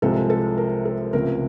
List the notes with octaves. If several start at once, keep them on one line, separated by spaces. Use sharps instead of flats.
C2 C3 F3 G#3 A4
A4
A#4
A4
C#2 C3 F3 A3 A#4